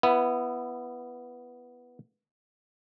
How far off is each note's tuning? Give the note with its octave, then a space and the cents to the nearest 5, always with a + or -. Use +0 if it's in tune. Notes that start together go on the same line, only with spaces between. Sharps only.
B3 +0 E4 +20